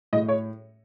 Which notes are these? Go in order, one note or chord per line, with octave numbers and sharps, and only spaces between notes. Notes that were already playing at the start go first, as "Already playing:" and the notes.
A2 D#5
C#5